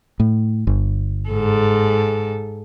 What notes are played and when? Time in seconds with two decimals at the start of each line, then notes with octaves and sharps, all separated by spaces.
0.20 A2
0.67 G1
1.29 G#2 A4